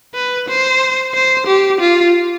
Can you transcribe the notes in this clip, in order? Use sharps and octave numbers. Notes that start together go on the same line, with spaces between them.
B4
C5
C5
G4
F4